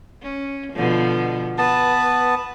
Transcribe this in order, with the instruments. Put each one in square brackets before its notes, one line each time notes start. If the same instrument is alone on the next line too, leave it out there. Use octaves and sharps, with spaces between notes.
[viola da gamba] C#4
B2 D3 F3
[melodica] B3 A5 [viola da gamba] B4